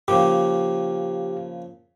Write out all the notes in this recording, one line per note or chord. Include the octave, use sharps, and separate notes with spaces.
A#2 C#3 F3 G4